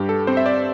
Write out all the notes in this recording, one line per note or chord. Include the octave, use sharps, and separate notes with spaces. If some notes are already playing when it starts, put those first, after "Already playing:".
Already playing: G2 G4
A4
C4 C5
E5
D5